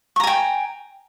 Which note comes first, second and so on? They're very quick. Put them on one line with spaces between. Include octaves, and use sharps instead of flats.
C#6 A#5 G#5 G5